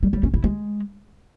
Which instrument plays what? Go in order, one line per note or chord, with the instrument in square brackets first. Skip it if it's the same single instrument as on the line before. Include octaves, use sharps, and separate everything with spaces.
[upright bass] G3
G3
C#4
E4
G#3